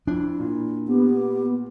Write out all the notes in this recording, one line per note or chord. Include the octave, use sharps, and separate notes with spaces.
F2 D4 E4
A#2
B3 G4